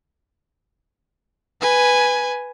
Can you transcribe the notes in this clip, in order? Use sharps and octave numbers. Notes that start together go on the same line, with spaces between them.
B4 G#5